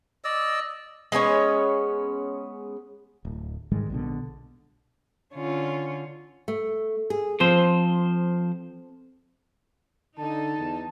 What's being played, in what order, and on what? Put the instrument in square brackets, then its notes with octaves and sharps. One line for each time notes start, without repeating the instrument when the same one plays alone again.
[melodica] D5 D#5 E6
[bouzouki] G#3 B3 C#4 C#5
[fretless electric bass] D1
G#2 D#3 G3 G#3
A#1 B2 D3
[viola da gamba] D3 C#4 F4
[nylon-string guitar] A3
G#4
[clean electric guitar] F3 C5 [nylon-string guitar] C4
[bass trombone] D3 [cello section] D#4 [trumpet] A5
[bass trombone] E2